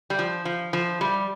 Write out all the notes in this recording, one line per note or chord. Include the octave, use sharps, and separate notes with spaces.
G3
F3
F3
F3
G3